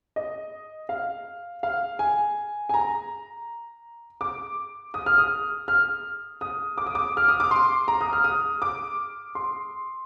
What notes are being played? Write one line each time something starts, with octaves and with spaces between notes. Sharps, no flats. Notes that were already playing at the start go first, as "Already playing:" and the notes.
D#5
F5
F5
G#5
G#5
A#5
D6
D#6
F6
D#6
F6
D#6
D6
D#6
D6
F6
D#6
D6
C6
A#5
D#6
F6
D#6
D6
C6